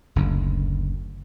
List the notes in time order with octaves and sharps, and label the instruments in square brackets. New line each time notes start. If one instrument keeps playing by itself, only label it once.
[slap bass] F#1 D2